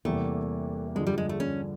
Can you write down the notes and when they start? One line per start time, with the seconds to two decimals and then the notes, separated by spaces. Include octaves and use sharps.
0.05 E2 C3 E3 G3 A3 A#3
0.95 G2 D3 F3 G#3
1.07 G3
1.18 G#3
1.29 A3
1.40 C#4